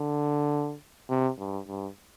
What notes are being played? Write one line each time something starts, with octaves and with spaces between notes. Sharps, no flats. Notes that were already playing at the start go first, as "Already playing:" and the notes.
Already playing: D3
C3
G2
G2